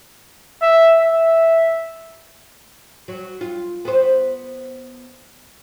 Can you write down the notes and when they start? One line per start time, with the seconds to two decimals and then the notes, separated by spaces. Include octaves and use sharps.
0.62 E5
1.00 E5
3.08 F#3
3.41 F4
3.85 B3 C5